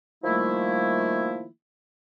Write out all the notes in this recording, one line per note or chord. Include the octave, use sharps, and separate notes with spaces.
D#3 F3 G3 A3 A#3 E4